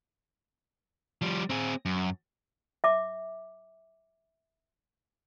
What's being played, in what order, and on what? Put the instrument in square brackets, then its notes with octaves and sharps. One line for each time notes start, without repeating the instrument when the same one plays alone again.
[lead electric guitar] F3 G3
C4 G#4
F#2
[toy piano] E5 D6